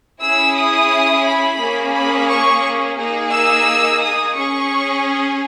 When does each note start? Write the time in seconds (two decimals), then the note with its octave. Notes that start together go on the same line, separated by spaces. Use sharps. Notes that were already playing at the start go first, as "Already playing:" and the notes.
0.21 C#4 E4 G#4 E6
0.55 D#6
1.25 B5
1.59 A#3 C#4 G#4
1.94 B5
2.29 C#6
2.97 A#3 D#4 G#4
3.32 E6
4.00 D#6
4.35 C#4 G#4 C#6